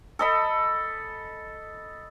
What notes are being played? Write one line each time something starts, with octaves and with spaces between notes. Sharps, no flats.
A4 D#5 B5